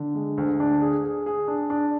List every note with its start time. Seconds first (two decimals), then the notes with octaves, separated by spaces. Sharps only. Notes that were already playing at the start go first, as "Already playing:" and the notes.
Already playing: D3
0.15 G#3
0.38 D2
0.60 D4
0.82 G#4
1.04 G#4
1.26 G#4
1.48 D4
1.70 D4